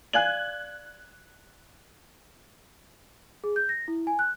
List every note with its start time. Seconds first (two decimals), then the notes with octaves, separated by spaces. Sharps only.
0.13 D5 F5 G#5 F#6 G#6 F#7
3.44 G#4
3.56 G6
3.69 A#6
3.88 E4
4.07 G#5
4.19 F#6